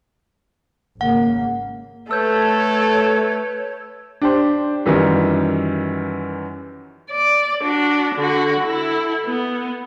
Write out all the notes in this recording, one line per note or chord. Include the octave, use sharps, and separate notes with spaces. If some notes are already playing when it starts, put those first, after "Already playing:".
G#1 C#3 A#3 F#5
A3 A4 B4 C#5 E6 G6
D4 G4 C5
F#2 D#3 E3 G3
D5
D4 F#4
D3 F#4
E4 A4
B3